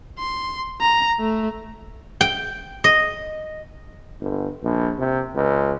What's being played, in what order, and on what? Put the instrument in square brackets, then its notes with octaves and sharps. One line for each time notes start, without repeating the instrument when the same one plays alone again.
[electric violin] C6
A#5
A3
[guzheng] G5
D#5
[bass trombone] G1
A#1
C3
C#2